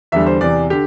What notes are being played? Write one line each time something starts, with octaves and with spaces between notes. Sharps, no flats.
E2 D3 G3 E5
C5
E2 C3 E3 D5
D3 G4